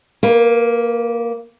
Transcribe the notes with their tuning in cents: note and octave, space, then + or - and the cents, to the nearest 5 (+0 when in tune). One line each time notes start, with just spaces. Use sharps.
A#3 +0 B4 -30